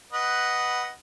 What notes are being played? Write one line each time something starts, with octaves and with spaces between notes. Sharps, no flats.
B4 D#5 F#5